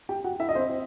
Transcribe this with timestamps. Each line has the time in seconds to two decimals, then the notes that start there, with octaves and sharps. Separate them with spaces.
0.09 G4 G5
0.24 F#4 F#5
0.40 E4 E5
0.49 D#5
0.55 C4 C5